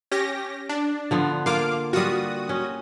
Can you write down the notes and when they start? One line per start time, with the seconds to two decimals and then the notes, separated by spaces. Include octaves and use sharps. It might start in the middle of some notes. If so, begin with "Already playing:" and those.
0.11 C#4 G4 A#6
0.69 D4
1.11 D3 F3 B3
1.46 A#3 F4 F5 D6
1.93 G3 F4 F#4 D#6
2.49 C#4